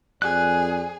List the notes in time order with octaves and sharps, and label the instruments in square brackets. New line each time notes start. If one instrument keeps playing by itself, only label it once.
[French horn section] F2 D5 [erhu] G#4 [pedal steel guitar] F#6